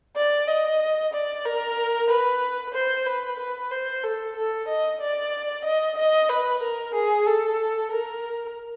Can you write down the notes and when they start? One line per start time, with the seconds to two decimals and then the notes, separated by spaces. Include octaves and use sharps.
0.16 D5
0.48 D#5
1.13 D5
1.45 A#4
2.10 B4
2.74 C5
3.06 B4
3.39 B4
3.71 C5
4.03 A4
4.36 A4
4.68 D#5
5.01 D5
5.65 D#5
5.97 D#5
6.29 B4
6.62 A#4
6.94 G#4
7.26 A4
7.91 A#4